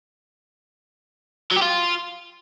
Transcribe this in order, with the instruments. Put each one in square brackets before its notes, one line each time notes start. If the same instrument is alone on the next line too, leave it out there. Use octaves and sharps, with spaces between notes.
[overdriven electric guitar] F#3
G4
F4